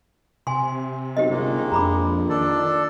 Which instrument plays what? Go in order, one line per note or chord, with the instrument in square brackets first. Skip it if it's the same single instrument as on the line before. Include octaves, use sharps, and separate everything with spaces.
[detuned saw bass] C3 [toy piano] G#5 C6
[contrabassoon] B1 [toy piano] G4 C5 D#5
[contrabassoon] G1 [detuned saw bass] C3 [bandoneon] D#3 G#3 A#3
[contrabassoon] A#1 [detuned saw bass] F2 [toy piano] A#5 B5 D6
[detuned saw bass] D#3 [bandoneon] D4 A4 D5